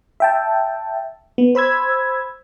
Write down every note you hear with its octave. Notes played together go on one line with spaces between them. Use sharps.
E5 G5 A5
B3
C5 B5 E6 G#6